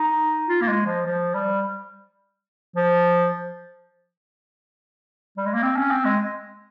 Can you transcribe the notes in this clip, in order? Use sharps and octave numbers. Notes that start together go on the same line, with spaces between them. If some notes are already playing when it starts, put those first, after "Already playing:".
Already playing: D#4
F4
A#3
G#3
F3
F3
G3
F3
G3
G#3
A#3
C4
C#4
C4
G#3